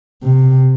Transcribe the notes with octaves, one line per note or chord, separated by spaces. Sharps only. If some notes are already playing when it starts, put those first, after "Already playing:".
C3